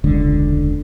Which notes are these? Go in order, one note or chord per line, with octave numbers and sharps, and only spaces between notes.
E1 C#2 D3 G#3